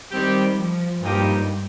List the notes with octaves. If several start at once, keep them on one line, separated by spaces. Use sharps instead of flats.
D#3 G3 C4 G4
F3
G2 A#2 F3 D#4 G4